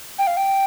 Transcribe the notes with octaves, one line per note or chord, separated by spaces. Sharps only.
G5
F5
G5